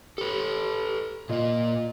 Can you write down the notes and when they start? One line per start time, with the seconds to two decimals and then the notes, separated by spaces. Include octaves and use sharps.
0.18 G4 A4 B4
1.29 A#2 A#3 F4 D#5